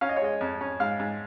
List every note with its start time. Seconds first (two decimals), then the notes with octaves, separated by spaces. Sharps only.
0.01 C#4 F5
0.09 D#5
0.16 C#5
0.22 G#3 D#5
0.41 F2
0.61 C#4
0.80 G#2 F5
0.99 G#2